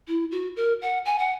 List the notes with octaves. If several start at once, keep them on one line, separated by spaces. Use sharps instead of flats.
E4
F#4
A#4
F#5
G#5
F#5